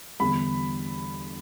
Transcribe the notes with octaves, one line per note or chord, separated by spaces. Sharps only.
E2 D3 G3 B5